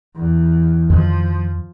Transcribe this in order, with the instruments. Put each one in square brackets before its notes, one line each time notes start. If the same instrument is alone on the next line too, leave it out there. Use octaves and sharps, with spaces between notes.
[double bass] E2
[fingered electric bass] F2 D#3 [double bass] F3